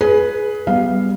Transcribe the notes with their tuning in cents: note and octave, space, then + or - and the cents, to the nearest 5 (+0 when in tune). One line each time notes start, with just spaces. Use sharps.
G#4 +15 B4 -5
G3 +0 B3 +5 F5 +0